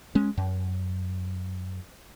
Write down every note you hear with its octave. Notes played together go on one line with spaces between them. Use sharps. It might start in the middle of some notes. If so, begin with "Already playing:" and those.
G#3 C#4
F#2